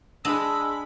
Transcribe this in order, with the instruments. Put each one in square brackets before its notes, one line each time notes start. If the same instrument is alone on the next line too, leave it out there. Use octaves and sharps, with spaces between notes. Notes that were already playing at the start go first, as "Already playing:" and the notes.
[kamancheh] G#3 B5 [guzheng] D4 D#5 [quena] E6